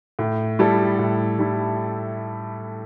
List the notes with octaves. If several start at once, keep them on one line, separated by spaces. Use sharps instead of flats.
A2
G3 E4 A4
A2
G3 E4